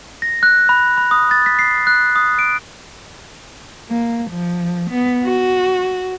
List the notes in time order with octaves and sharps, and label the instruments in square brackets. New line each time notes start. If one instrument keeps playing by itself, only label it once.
[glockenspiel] A#6
F#6
B5
B5
D#6
A6
B6
C7
F#6
D#6
D7
[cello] A#3
F3
B3
F#4